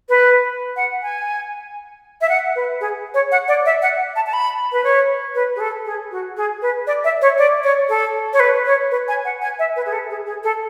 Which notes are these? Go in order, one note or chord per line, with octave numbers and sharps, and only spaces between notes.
B4
F#5
G#5
E5
F#5
B4
G#4
C#5
F#5
D5
E5
F#5
A5
A5
B5
B4
C#5
B4
G#4
A4
G#4
F#4
G#4
B4
D5
E5
C#5
D5
C#5
A4
C#5
B4
C#5
B4
G#5
F#5
G#5
E5
B4
G#4
A4
G#4
G#4
A4